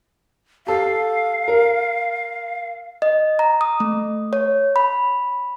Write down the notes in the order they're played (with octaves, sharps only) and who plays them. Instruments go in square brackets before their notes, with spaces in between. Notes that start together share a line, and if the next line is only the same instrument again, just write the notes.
[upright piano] G4 A4 [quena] F5
[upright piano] A#4
[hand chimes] D#5
A#5
D#6
A3
C#5
B5